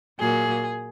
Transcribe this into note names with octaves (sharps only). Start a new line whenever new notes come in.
A#2 F#3 A#3 G#4